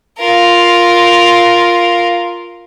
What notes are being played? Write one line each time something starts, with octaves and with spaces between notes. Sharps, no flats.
F4 A#4